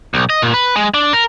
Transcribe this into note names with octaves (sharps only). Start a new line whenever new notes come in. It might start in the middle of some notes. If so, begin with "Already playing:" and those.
B1
D#5
A#2
B4
G#3
D4
A#4